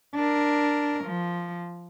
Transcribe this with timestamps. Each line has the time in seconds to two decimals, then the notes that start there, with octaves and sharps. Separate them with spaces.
0.15 D4 A#4
1.04 F3